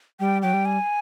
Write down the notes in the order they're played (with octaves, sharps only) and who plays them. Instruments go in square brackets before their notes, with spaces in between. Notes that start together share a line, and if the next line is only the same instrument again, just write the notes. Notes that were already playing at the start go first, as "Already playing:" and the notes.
[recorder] G3 [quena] G5
[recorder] F#3 [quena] G5
[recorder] G3
[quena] G#5